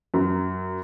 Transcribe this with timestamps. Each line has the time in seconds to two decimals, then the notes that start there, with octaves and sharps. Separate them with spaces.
0.14 F#2